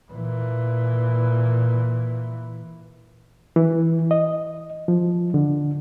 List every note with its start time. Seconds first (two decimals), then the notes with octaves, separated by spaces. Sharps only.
0.12 A#2 E3
3.56 E3
4.11 D#5
4.88 F3
5.34 D3